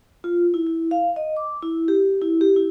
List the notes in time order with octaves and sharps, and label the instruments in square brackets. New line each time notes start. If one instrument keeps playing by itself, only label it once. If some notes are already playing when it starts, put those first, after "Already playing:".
[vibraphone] F4
E4
E4
F5
D#5
D6
E4
G4
E4
G4
E4